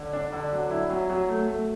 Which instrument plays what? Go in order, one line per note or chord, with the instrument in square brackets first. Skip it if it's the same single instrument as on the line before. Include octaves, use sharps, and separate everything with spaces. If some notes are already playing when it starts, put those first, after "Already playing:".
Already playing: [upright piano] D3
D4
D3
F#3
E4
F#3
F#3
A3
A3